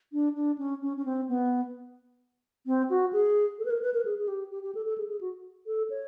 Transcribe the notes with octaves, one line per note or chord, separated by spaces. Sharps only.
D4
D4
C#4
C#4
C#4
C4
B3
C4
F#4
G#4
A4
B4
A#4
B4
A#4
G#4
G#4
G4
G4
G4
A4
A4
G#4
G#4
F#4
A4
C#5